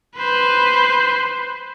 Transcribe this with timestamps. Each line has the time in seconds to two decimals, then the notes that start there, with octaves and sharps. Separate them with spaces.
0.17 B4 C5